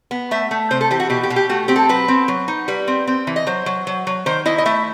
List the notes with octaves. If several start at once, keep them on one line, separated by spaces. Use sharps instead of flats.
B3
A3 E5
A3
C3 C5
A4
E3 G4
F#4
B2 G4
G4
B2
G4
A3 F#4
C4 G4
A4
F#3 B4
C4
F#3
D#4
G3 B4
C4
C4
E3
D#5
F#3 C5
F#3
F#3
F#3
D#3 C5
E4 D#5
D#5
A3 E5